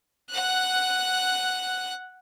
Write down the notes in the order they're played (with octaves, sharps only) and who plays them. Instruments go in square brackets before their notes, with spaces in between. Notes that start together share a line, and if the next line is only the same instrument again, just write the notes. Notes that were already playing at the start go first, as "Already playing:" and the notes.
[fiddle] F#5 F#6